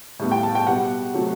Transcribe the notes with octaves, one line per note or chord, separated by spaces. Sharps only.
A2 G3 B3
G5
A5
G5
B2 G3 B3 F#5
C3 F#3 A3